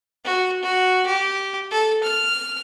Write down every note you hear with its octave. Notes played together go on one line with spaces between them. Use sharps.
F#4
F#4
G4
A4
F6